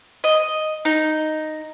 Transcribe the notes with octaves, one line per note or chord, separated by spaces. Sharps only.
D#5
D#4